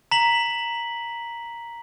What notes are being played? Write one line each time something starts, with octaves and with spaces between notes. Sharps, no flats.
A#5 B6 F#7